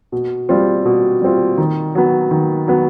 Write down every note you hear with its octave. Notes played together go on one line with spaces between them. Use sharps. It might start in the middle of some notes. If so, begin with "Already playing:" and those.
B2
G3 C4 F4
B2
G3 C4 F4
D#3
F#3 B3
D#3
F#3 B3